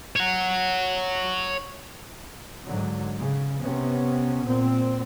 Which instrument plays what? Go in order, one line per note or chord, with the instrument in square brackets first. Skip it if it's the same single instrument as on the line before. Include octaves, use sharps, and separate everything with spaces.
[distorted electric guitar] C#5 F#5
[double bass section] G#2 D3 F#3
C#3
C3 B3 C#4
A#2 C4